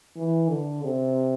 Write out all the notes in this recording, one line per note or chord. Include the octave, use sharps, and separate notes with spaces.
E3
D3
C3